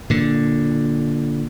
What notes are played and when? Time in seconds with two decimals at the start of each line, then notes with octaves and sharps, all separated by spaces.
0.10 A#2 D3